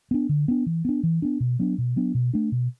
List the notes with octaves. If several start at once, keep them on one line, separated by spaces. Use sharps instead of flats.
B3 D4
D3
B3 D4
E3
B3 D4
E3
B3 D4
B2
F#3 B3 D4
B2
F#3 B3 D4
B2
A3 D4
B2